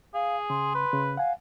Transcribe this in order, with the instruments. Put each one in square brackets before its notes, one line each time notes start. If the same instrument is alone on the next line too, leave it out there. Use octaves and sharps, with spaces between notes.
[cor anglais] G#4 [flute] F5
[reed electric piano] C#3 [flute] C6
[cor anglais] B4
[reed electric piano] C#3
[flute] F5 [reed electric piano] F#5 G#5